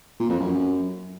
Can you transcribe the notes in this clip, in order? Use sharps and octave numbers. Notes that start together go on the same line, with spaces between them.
A#2
F2
F#2